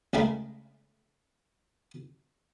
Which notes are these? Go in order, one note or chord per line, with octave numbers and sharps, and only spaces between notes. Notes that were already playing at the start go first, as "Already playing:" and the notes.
C#2 C#3 G#3 A3 A#4 B5